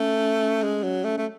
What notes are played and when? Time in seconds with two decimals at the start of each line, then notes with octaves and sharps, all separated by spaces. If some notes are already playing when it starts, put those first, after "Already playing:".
Already playing: A3 C#4
0.63 G#3
0.83 F#3
1.04 A3
1.18 A3